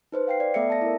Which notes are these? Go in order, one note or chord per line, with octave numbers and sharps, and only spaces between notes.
D#4 B4 C5
F5 G5 C7
D5
A3 B3 A4 D5 E5 C#7
A5 A#6
E4 A#4